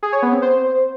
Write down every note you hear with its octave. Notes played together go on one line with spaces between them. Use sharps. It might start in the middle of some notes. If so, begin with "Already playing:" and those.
G#4
C#5
B3
C4
C5